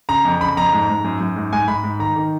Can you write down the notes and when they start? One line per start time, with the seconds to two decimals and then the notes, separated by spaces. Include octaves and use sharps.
0.09 C#3 A#5
0.25 F2
0.41 C#3 B5
0.57 F2 A#5
0.73 G#2
0.89 G#2
1.04 F#2
1.20 F#2
1.36 G#2
1.53 G#2 G#5
1.68 G#2 B5
1.84 G#2
1.99 D#3 A#5
2.16 D#3